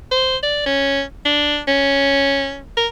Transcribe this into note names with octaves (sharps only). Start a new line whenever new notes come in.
C5
D5
C#4
D4
C#4
A#4